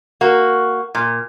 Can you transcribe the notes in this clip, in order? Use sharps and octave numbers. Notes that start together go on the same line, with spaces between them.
A#3 F#4
A#2